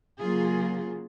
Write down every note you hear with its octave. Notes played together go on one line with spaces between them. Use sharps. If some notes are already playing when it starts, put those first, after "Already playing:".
C#3 F#3 A#3 F4 G#4